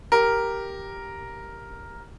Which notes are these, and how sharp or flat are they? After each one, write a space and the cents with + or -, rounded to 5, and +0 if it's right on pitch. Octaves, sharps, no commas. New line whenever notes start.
G4 +0 A#4 +0